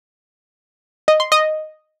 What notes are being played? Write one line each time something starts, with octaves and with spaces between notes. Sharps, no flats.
D#5
C6
D#5